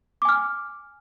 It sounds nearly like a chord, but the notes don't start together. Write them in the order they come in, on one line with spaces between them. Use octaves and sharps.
D6 G#5 F6